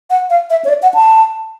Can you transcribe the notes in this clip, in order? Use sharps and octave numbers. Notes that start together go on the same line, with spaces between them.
F#5
F5
E5
C#5
D5
F#5
A5